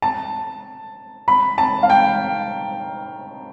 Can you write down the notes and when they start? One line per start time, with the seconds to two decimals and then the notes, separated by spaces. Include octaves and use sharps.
0.02 A5
1.28 B5
1.58 A5
1.83 F5
1.90 G5